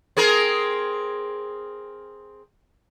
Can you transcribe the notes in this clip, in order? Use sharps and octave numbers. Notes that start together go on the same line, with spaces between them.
C4 G#4 A#4